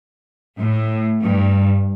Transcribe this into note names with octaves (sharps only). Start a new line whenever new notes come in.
A2
G2